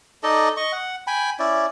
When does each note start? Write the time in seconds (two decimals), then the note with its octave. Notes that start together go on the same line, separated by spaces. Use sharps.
0.23 D#4 A4 D5 D#5
0.57 D#5 C#6
0.72 F#5
1.07 G5 G#5 B5
1.39 C#4 E4 D5